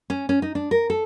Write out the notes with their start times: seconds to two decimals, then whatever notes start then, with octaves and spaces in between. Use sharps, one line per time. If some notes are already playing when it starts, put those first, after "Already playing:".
0.10 C#4
0.29 C#4
0.42 D#4
0.55 D4
0.71 A#4
0.90 A4